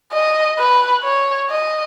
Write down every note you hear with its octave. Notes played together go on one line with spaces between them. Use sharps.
D#5
B4
C#5
D#5